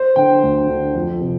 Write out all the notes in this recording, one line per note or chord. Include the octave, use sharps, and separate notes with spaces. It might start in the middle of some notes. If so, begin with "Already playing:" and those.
Already playing: C5
D3 G5
D2
D3
F2
C3